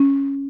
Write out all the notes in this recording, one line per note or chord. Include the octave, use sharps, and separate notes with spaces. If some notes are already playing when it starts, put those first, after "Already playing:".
Already playing: C#4